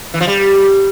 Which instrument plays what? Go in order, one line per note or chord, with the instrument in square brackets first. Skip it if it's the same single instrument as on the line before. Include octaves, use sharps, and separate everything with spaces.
[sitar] E3
F3
G3